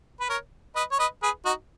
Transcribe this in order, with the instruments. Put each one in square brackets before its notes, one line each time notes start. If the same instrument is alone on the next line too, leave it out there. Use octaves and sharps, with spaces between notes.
[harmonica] B4
A#4 C#5
B4 D#5
C#5
B4 D#5
G#4 B4
D#4 F#4